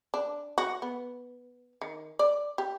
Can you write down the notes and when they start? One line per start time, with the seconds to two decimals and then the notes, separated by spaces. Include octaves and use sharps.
0.14 D4
0.58 F#4
0.82 B3
1.81 D#3
2.19 D5
2.58 G4